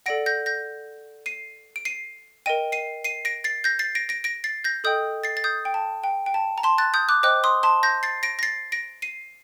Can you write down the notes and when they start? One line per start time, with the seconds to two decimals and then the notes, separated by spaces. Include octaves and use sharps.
0.06 A4 D5 F#5 A#6 D7
0.26 G6 A#6
0.46 G6 A#6
1.26 C7 D#7
1.76 D7
1.85 C7 D#7
2.46 A#4 D#5 G5 D#7
2.72 C7 D#7
3.04 C7 D#7
3.25 A#6 D7
3.44 A6 C7
3.64 G6 A#6
3.79 A6 C7
3.95 A#6 D7
4.09 A#6 D7
4.24 A#6 D7
4.44 A6 C7
4.64 G6 A#6
4.84 A4 D#5 G5 D#6 G6
5.24 A6 C7
5.37 A6
5.44 D#6 G6
5.65 G5
5.74 A5
6.04 G5
6.26 G5
6.34 A5
6.58 A#5
6.63 A5 C6
6.78 F#6 A6
6.94 D#6 G6
7.09 D6 F#6
7.23 C5 D#5 G5 D6 F#6
7.44 C6 D#6
7.63 A5 C6
7.83 G6 A#6
8.03 A6 C7
8.23 A#6 D7
8.39 A#6
8.43 A6 C7
8.72 A#6 D7
9.02 C7 D#7